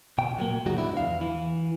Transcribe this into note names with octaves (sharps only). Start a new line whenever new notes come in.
B2 G5
A#2 F#3 G#3 A#3
C#2 F#2 F#3 G#3 D#4 F#4
G#2 B3 D4 E4
E2 F5
E3